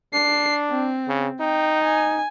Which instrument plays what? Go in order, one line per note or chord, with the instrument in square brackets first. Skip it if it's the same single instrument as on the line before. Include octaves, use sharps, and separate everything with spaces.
[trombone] D4 [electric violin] C7
[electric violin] C4
[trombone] C#3
[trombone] D#4 [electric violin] G5
[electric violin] G#5